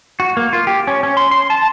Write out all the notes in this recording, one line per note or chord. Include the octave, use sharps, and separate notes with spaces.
F#4
A#3
F4
G4
C#4
C#4
C6
C6
A5